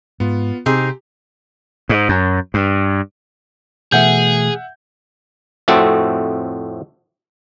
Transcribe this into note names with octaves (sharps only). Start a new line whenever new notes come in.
G#2 B3 F4
C3 C4 D#4 G4 G#4
G#2
F#2
G2
B2 E3 A3 G#4 E5 F#5 G6
F2 A2 A3 C4 F#4 A4